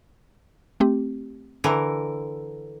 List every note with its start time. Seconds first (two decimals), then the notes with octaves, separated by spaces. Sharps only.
0.80 A3 C4 G4
1.64 D3 E3 A#4